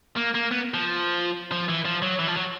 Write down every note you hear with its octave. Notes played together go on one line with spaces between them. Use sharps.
A#3
A#3
B3
F3
F3
E3
F3
F#3
E3
F3
F#3